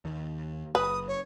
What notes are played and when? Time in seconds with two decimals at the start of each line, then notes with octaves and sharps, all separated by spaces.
0.05 D#2 D#3
0.75 F#1 B4 D#6
1.08 C#5